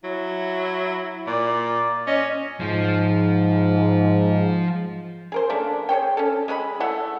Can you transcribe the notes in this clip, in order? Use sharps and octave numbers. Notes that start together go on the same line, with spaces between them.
F#3 E4
A#2 D5
C#4 D#5
G#2 F3
G#4 A#4 C5
C#3 A3 A#3 D4
G#4 C5 C#5 G5
C#4 A4
G#3 G#4 C#5 B5
A3 E4 F#5